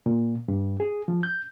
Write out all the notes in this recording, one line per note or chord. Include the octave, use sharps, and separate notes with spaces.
A#2
G2
G#4
F3
G6